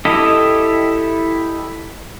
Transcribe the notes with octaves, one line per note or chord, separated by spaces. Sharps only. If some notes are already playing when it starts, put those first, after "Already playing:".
E4 G4 A4 D#5